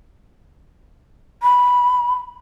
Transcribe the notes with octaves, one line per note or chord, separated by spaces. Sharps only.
B5